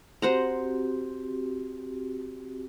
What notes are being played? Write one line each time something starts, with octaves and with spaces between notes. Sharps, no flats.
C4 F#4 G4 C5 F#5 A#5